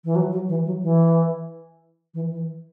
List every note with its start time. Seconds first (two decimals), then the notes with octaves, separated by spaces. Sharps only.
0.05 E3
0.16 F#3
0.32 F#3
0.49 E3
0.66 F#3
0.82 E3
2.14 E3
2.31 E3